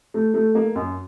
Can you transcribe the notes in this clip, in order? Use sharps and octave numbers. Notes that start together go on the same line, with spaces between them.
A3
A3
A#3
F#2